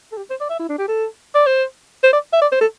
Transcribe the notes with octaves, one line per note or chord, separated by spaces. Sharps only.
A4
G4
C5
D5
E5
E4
D4
G4
A4
D5
C5
C5
D5
E5
D5
C5
A4